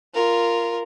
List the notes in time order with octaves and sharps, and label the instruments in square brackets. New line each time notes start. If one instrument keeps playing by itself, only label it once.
[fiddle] F4 A#4